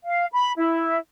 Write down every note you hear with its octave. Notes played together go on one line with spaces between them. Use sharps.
F5
B5
E4